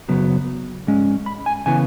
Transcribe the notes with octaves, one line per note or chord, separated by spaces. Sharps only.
F#2 C#3 F#3 B3
G#2 G#3 C#4
B5
G#5
C#3 E3 B3 G#5